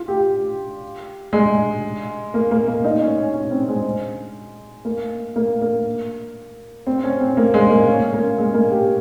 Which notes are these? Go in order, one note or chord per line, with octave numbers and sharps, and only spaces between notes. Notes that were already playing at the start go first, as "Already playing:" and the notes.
Already playing: F4
G4
G#3
A#3
A#3
A#3
D#4
C#4
C#4
C#4
C4
G#3
A#3
A#3
A#3
C4
C#4
C4
A#3
G#3
A#3
C#4
A#3
G#3
A#3
G4